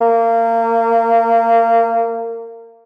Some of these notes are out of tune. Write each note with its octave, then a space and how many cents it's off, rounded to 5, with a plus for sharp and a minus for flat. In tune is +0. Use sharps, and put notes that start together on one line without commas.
A#3 -25